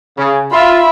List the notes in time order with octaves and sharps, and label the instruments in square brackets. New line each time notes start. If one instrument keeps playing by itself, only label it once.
[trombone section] C#3
[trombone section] F4 [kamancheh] E5 B5